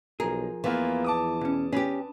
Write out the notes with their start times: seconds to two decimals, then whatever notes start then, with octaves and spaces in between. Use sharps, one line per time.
0.20 B1 F3 G#4 A#4 A#5
0.64 E2 E3 A#3 B3 F4
1.04 A5 D6 D#6
1.41 B2 C#4
1.73 C#4 D4 G4 B4